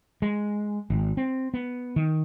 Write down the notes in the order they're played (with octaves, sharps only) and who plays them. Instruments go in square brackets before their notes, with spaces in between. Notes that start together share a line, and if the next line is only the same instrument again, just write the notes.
[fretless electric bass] G#3
G#1
C4
B3
D#3